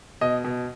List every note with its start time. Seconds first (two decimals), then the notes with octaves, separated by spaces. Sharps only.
0.21 B2 D#5
0.44 B2